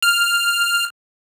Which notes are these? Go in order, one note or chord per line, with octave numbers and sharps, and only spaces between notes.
F6